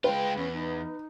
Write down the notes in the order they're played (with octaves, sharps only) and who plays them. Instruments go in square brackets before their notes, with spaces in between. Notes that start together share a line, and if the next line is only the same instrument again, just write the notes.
[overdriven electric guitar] G#3 F4 [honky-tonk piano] B4 [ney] G5
[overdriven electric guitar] E2 [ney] C#4
[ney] D#4